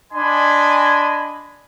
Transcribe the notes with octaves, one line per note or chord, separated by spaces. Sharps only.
D4 D#5 G#5 B5 C6